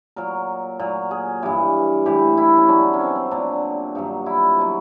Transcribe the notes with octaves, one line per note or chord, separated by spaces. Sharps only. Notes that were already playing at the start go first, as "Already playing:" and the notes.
A#2 F#3 A#4
A#2 F#3
G#4
G2 E3 G4
A2 E3 G4
E4
C#4
B2 F#3 D4
C#4
C4
C4
A#2 F#3 D4
G2 D#3 F#3
E4
B2 F#3